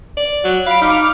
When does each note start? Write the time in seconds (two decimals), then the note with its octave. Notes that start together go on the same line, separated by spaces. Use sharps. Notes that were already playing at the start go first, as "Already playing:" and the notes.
0.17 D5
0.44 F#3
0.66 F5 B5 D7
0.82 D#4 D6 F6